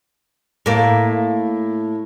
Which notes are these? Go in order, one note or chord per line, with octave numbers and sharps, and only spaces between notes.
A2 A#3